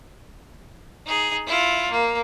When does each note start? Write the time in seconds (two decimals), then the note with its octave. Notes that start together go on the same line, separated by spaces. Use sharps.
1.05 D#4 G#4
1.46 E4 F4
1.91 A#3